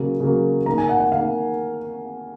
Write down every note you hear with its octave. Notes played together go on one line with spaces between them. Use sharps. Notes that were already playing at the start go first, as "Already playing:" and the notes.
Already playing: C#3 F#3 A#3
C#3 F#3 A#3
D#3 A#3 A#5
G#5
F#5
F#5
D#3 A#3 F5